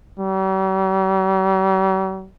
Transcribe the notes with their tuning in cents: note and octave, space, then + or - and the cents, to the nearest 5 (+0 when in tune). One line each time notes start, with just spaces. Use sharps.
G3 -45